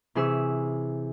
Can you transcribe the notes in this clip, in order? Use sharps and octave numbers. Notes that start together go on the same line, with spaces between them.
C3 E3 G#4 C#6 E6